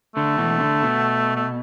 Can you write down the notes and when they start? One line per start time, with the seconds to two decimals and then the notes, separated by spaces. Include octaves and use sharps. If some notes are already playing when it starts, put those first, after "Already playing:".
0.16 D3 A3
0.38 B2 E3
0.60 D3
0.83 B2
1.36 A3